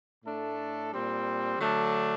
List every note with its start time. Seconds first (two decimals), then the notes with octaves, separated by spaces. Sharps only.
0.24 A2 A3 D4 A4
0.92 A#2 G3 C4
1.59 D3 F#3 A3 D4